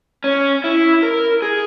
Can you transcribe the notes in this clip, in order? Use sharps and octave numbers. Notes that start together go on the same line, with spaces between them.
C#4
E4
A#4
G#4